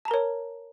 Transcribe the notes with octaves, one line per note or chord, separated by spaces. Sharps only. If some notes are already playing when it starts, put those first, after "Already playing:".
A#4 C#5 A5 A#5